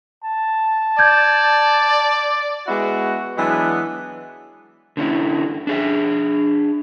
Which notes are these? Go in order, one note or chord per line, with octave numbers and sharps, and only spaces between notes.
A5
D5 G6 G#6
G#3 B3 E4 F#4
E3 F#3 G#3 B3 D4
D3 C#4 D#4 E4
D4 G#4 E5